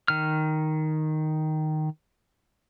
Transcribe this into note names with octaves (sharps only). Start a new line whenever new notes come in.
D#3 F6